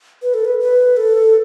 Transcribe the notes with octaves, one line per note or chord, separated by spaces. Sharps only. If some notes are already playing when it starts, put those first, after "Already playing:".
B4
A4
B4
B4
A4